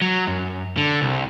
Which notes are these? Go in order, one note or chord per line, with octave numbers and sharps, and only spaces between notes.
F#3
F#2
D3
C2